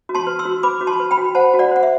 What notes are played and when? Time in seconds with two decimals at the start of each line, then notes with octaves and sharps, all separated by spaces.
0.09 F#4
0.15 A5 C6
0.27 B4
0.39 C6 E6
0.45 F#4
0.63 B4 B5 D6
0.81 F#4
0.87 A5 C6
1.00 B4
1.11 G5 B5
1.17 F#4
1.35 C5 F#5 A5
1.54 F#4
1.59 D5 F#5
1.71 C5 F#5
1.83 E5